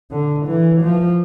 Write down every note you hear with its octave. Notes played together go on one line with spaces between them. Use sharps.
D3
E3
F3